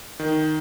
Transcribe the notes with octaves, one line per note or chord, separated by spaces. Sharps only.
D#3